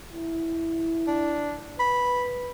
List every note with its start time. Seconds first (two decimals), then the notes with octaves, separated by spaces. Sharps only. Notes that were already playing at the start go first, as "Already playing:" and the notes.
0.13 E4
1.07 D4
1.79 B4 B5